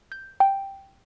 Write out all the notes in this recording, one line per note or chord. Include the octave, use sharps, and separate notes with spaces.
G6
G5